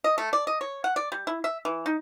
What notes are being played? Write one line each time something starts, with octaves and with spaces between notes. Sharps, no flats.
D#5
A3
D5
D#5
C#5
F#5
D5
G3
E4
E5
E3
D#4